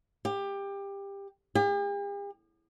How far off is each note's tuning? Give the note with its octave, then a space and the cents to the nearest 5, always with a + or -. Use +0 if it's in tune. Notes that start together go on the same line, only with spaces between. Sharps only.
G4 +20
G4 +45